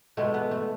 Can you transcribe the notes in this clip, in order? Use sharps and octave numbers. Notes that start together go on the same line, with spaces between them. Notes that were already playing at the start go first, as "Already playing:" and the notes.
B2 G#3 A3
B3
A3